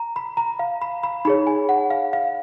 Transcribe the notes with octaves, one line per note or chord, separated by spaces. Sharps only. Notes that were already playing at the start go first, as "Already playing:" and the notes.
Already playing: A#5
B5
A#5
F5
B5
B5
D#4 G#4 C#5 B5
G#5
F#5
F5
F5